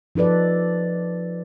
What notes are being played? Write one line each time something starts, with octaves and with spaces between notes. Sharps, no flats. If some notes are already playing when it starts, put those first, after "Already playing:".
F3 D#4 A4 B4 D5